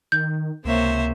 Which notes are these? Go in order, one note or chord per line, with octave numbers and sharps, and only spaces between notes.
D#3 G6
C#2 C3 A#3 C5 C#5 E5